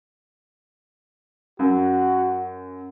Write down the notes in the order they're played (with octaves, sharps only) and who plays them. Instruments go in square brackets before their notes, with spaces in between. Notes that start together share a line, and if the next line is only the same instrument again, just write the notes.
[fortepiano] F#2 [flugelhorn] F#4